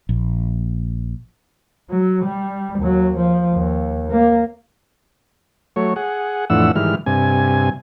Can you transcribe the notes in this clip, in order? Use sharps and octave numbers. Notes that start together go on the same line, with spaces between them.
A#1
F#3
G3
D#2 F#3
F3
D#2
A#3
F#3 A3 C#5
G#4 F#5
F2 A2 E3 D4 F#5 E6
G#2 D#3 E3 G3 F6
G2 C3 G#5